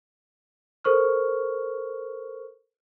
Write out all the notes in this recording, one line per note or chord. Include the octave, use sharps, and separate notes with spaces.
A4 A#4 C5 C#6 F6